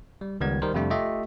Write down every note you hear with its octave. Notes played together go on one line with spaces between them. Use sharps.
G3
C#2 D#3 G3 B3 G#6
D#3 G3 A#4 C5
F2 C3 G3 A3 D4
A3 F4 G4 D#5 E5